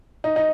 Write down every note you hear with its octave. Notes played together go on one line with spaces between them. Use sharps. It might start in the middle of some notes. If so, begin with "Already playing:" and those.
D#4
D#4